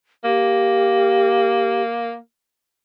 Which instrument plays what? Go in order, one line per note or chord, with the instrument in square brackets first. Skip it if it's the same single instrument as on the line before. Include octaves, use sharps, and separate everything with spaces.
[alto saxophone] A#3 [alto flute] G4